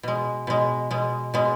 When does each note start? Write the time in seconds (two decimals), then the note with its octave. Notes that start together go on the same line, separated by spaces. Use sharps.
0.03 B2 G#3
0.47 B2 G#3
0.91 B2 G#3
1.34 B2 G#3